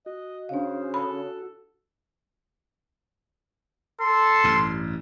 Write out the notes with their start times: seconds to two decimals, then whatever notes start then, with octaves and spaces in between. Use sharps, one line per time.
0.06 F#4 D#5
0.49 C#3 D4 C5 F5
0.94 A4 B5
4.00 A4 C6
4.44 A1 G2